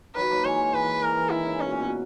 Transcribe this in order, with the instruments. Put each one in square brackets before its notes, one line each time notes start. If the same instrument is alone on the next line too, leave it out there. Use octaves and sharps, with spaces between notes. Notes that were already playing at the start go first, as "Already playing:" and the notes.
[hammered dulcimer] D#3 F#3 [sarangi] B4
[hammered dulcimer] F#3 A#3
[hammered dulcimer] E3 G#3 [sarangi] C#5
[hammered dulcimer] E3 [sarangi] B4
[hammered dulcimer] E3
[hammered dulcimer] E3 [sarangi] A#4
[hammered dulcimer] E3
[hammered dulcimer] D#3 [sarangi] E4
[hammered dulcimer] C#3
[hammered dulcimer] B2 [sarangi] C#4
[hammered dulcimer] A#2
B2